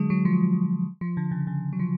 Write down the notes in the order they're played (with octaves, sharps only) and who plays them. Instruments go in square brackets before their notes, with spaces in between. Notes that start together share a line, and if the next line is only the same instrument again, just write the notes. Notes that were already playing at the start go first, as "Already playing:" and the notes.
Already playing: [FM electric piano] D3 F#3 G#3
F#3
F3
F3
D3
C#3
C#3
F#3
F3